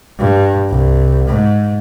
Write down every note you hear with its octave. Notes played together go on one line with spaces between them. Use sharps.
G2
C2
G#2